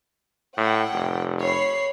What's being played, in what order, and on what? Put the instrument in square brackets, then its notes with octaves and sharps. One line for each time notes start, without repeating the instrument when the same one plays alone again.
[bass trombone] A2 [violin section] F#5 G5
[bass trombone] F1
[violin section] C#5 B5 C7